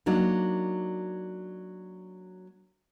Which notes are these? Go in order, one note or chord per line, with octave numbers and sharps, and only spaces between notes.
F#3 A#3 D4 D#4